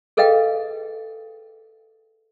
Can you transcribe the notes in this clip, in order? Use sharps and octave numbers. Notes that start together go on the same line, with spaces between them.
G#4 A4 B4 D#5 F5 G5